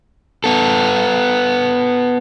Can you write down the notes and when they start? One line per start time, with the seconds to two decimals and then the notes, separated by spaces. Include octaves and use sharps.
0.44 B3 A4